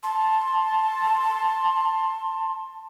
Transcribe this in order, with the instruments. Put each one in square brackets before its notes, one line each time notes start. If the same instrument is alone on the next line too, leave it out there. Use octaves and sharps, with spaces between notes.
[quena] A5 [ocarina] C6